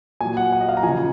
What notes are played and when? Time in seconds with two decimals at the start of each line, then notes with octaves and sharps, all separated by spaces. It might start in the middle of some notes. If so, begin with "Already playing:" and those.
0.21 A#2 F#3 G#5
0.37 F#5
0.52 F#5
0.60 D#5
0.69 F5
0.77 A#5
0.83 F3 G#5
0.89 C#3